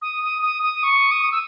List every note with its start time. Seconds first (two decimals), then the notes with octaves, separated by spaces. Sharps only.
0.02 D#6
0.23 D#6
0.42 D#6
0.63 D#6
0.83 C#6
1.11 D#6
1.32 E6